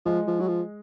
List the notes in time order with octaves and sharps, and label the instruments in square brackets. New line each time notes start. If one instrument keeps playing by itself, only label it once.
[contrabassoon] F3 [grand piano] G#3
[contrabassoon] F3
F#3
F3